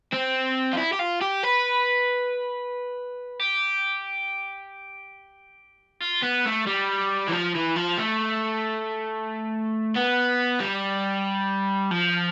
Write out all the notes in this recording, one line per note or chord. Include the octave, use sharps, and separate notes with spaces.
C4
F4
E4
G4
F4
G4
B4
G4
F4
B3
A3
G3
E3
F3
E3
F3
A3
B3
G3
F3